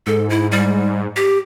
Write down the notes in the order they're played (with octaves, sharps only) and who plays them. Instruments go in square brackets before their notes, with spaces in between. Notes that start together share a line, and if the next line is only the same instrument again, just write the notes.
[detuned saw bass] G#2 [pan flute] A4
[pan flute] E4
G3
G4